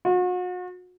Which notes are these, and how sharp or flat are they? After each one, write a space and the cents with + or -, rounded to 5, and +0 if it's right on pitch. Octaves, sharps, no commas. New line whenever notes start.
F#4 -40